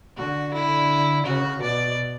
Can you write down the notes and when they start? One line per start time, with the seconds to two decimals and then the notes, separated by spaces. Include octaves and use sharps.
0.17 D3 F#4
0.53 E4
1.26 C#3 F#4
1.62 B2 D5